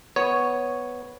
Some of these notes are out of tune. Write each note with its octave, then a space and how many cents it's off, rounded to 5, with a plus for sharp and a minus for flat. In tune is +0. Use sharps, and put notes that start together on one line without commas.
B3 +0 C#5 +0